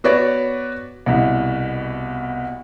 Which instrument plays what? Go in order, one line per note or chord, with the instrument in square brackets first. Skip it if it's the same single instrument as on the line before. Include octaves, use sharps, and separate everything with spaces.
[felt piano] B3 F#4 B4 C#5 D5
C2 B2